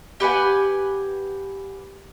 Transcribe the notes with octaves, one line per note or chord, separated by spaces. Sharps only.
G4 B4 F#5 G#5